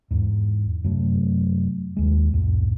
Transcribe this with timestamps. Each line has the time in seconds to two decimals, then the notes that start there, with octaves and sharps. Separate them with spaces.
0.11 E2 G#2
0.84 F#2 C3 F#3 A3
1.97 D#2 G#3
2.32 C2 F2 A2